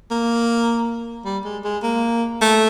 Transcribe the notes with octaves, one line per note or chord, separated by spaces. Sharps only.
A#3
G3
G#3
G#3
A#3
A3